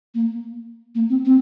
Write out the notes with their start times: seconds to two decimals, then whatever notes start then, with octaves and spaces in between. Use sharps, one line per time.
0.15 A#3
0.95 A#3
1.09 C4
1.25 C4